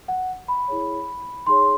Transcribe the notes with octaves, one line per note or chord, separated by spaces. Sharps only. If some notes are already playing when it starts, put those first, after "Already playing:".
F#5
B5
E4 G#4 C#5
D#4 G#4 C#5 C6